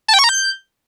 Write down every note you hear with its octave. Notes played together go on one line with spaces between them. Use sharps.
A5
G5
C#6
A#5
G6